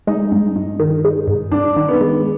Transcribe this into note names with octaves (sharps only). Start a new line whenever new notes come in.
G#3 D#4
G2
G2
D#3
G#3
G2
G2 D4
D#3
B3
G#3